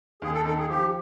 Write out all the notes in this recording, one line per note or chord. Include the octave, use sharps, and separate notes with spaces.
D#2 G#4
A4
D#3 A4
G#4
F3 G4